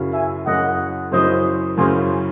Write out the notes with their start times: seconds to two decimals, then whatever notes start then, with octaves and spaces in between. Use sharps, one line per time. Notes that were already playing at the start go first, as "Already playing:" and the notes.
Already playing: F#2 C#3 F#3 C#4 E4
0.13 E5 G#5
0.46 F#2 C#3 F#3 C#4 E4 D#5 F#5
1.12 F#2 C#3 F#3 C#4 E4 C5 D#5
1.77 F#2 C#3 F#3 C#4 E4 G#4 C5